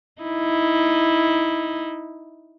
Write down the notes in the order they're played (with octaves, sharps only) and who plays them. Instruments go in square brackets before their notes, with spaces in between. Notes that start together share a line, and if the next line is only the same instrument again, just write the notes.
[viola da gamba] D#4 E4